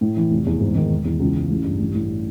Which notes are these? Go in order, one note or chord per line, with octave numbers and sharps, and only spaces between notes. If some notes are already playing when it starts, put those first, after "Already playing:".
A2
E3
F1
E2
G#2
D#3
E1
E2
C#2
C#3
A1
G2
A1
A2